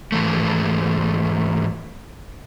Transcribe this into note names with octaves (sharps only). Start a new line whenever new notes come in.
G#2 E3 A3